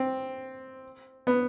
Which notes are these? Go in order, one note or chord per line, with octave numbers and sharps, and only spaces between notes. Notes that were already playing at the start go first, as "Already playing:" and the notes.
Already playing: C4
B3